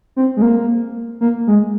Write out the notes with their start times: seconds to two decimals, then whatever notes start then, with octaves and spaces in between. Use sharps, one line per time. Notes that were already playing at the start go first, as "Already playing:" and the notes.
0.16 C4
0.37 G#3
0.42 A#3
1.21 A#3
1.47 G#3